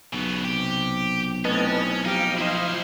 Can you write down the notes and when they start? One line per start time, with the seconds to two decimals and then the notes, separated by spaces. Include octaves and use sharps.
0.13 B1 C#3 B3
0.45 C3 G4
1.45 A3 C4 C#4 E4 B4 D#5 A5
2.05 F3 D#4 G4 F5
2.38 D#4 E4 C5